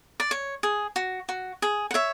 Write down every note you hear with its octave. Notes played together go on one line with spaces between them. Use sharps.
D5
C#5
G#4
F#4
F#4
G#4
F#5
C#5 E5